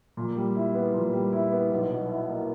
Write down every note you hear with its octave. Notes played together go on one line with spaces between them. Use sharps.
A#2
G3
E4
B3
A#2
G3
E4
B3
B1
B2
E4
A#3